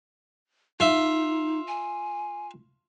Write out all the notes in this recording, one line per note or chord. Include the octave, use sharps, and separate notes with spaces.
D#4 F4 E5
G#5